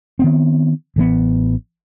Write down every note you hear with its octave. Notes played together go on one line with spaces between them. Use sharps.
D#3 B3 C4
A1 E3 A#3 B3